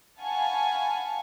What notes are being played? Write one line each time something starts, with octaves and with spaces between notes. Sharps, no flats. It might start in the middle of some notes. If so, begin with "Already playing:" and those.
F5 F#5 G#5 A5 B5 C#6